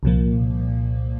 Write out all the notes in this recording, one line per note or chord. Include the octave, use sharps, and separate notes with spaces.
C2 A#2 F3 A#3